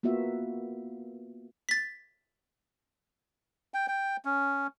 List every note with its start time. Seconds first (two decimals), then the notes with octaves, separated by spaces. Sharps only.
0.03 A#3 B3 F4 F#4 E5
1.69 A6 B6
3.74 G5
3.88 G5
4.25 C#4